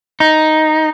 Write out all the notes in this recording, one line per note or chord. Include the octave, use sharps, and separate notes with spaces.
D#4